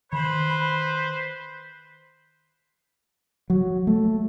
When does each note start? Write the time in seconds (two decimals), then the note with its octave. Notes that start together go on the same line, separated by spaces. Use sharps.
0.13 D#3 B4 C5 B5
3.50 F#3
3.87 A3